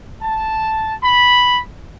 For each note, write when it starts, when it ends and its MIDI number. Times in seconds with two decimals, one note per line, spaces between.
0.20 0.93 81
1.03 1.60 83